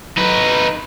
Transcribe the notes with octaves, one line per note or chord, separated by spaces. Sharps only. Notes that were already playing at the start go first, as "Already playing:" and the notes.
D#4 B4